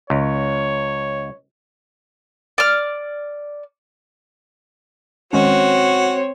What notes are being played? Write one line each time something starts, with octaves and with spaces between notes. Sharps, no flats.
C#2 C#5
D5 F6
D#3 G#3 C4 C#4 F#4 C#5